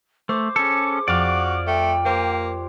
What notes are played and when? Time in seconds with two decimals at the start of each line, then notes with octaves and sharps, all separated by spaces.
0.29 A3 C5 D6
0.56 C#4 G#4 A4
1.08 F2 F#4 D5 F5
1.67 A3 G5
2.05 A#3 G4 C5